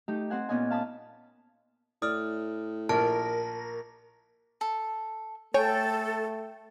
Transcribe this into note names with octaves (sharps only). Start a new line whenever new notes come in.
A3 D#4 G4
C4 C5 F#5 G#5
A#2 B3 C#4 D#5 G#5
F5 A5 B5 D#6
A2 D5 D#6 F6
A#1 A#4 A5
A4
A3 A4 C#5 G5 G#5